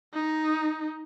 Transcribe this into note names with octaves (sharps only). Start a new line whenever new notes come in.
D#4